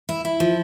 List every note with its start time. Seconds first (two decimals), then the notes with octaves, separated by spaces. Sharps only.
0.09 E4
0.25 E4
0.40 F3